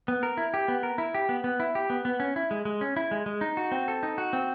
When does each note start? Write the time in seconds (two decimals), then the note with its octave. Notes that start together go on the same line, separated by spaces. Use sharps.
0.08 B3
0.23 A#4
0.37 E4
0.54 G4
0.68 B3
0.83 A#4
0.98 E4
1.15 G4
1.29 B3
1.44 B3
1.60 E4
1.75 G4
1.90 B3
2.05 B3
2.20 C#4
2.36 E4
2.51 G#3
2.65 G#3
2.81 C#4
2.96 E4
3.11 G#3
3.26 G#3
3.41 D#4
3.57 F#4
3.72 C4
3.88 A4
4.03 D#4
4.18 F#4
4.33 C4